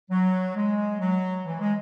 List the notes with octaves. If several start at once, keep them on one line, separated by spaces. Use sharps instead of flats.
F#3
G#3
F#3
E3
G#3